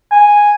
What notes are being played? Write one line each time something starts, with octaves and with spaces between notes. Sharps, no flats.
G#5